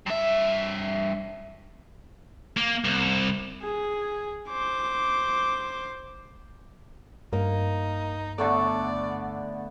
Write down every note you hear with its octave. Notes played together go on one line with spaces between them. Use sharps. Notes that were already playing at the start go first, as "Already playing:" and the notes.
G2 E5
A#3
C2
G#4
C5 D6
G2 A#3 D#4
D3 A3 B3 A4 D5